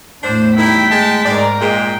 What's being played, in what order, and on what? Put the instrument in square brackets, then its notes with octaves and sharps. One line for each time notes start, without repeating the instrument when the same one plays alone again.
[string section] E2 A2 [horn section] D4 C5
[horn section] D#3 G3 E4 [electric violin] G5 B6
[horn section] G#3 A5
[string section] G#2 A#4 [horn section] G#3 D5
[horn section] A#2 G#3 [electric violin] G5